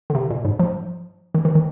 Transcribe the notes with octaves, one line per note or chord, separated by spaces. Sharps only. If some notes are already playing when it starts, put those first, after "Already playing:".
D3
C3
A#2
G#2
F3
D#3
D#3
D#3